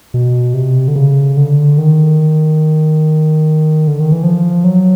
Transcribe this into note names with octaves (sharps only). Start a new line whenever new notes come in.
B2
C3
D3
C#3
D3
D#3
D3
D#3
E3
F3
F#3